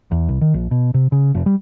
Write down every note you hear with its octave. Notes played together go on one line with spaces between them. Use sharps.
E2
C2
D#3
A#1
B2
C3
C#3
F1
G3